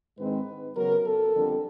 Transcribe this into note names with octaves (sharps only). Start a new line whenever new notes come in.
G#2 D#3 G#3 C4 D#4 B4
C#3 F#3 B3 A#4
A4
F2 D3 G3